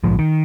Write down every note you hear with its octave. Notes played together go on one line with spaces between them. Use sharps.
A#1 G#2 F3
D#3